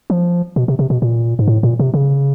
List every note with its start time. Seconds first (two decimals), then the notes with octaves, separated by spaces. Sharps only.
0.10 F3
0.56 B2
0.68 C3
0.79 C3
0.90 B2
1.02 A#2
1.39 G#2
1.48 A2
1.63 A#2
1.79 C3
1.94 C#3